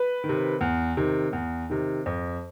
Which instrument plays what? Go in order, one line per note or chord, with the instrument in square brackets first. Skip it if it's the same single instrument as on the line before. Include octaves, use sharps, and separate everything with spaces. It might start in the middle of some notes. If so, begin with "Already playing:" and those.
Already playing: [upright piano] B4
[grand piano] D#3
C3
E2
C3 D#3
E2
C3 D#3
F2